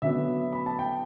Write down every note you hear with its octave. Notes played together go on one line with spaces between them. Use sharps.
D3 F#3 B3 E5
B5
A5
G5